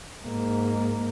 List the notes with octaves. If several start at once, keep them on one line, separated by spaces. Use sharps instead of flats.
G#2 A#3